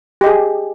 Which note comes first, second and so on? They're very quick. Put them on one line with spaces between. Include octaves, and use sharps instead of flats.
G4 D#5 G#4